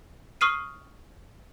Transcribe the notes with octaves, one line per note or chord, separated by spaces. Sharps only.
C#6 D#6 F6 C7 D#7